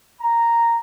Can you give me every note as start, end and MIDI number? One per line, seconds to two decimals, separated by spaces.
0.21 0.78 82